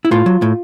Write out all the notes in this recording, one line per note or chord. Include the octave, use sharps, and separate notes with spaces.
E4
A2 F4
F#3
A2